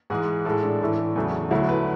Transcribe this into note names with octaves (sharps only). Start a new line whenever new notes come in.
G#2 E3 G#3 G#4
A2 G#3 A4
D4
A2 E3 A3
E2 C#3 F#3 A3
D2 D3 F#3 A3 E4
B4